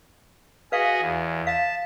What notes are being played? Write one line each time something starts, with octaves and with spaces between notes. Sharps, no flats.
F#4 G#4 B4 D#5 F5
E2
F5 A5